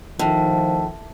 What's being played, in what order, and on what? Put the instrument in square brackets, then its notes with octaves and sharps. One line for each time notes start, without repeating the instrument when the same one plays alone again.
[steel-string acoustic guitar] A2 [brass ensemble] D#3 F3